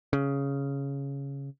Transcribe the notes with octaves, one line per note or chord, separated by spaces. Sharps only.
C#3